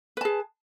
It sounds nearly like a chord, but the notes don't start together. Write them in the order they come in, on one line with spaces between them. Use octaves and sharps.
B4 A5 G#4